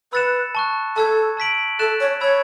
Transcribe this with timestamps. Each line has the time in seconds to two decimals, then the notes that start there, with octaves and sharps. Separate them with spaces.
0.12 B4 B5 E6 A6 C#7 E7
0.55 A5 C#6 F#6
0.96 A4 A5 E6 G#6
1.37 A5 E6 B6 D7 F#7
1.79 A4 F#6 A6 E7
2.00 C#5
2.21 C#5 B5 E6 G#6